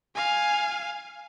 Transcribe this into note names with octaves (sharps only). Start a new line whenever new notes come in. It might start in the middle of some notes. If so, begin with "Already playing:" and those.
F5 G#5